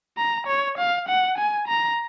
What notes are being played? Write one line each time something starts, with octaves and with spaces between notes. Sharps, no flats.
A#5
C#5
F5
F#5
G#5
A#5